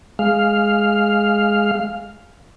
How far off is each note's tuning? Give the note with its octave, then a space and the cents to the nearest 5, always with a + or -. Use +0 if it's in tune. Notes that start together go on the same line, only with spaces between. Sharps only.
G#3 +0 F5 +0